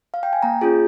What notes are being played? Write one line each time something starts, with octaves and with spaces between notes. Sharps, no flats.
F5
G5
G#5
A#3 A#5
C#4 F4 G#4